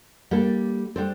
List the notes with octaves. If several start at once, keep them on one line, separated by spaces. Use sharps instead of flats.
G3 A#3 D4 A4
G3 D4 A4 C5